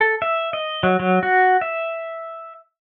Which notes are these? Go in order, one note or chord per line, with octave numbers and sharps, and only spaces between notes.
A4
E5
D#5
F#3
F#3
F#4
E5